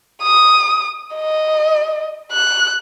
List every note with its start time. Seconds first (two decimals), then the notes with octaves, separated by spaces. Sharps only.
0.22 D#6
1.15 D#5
2.32 F#6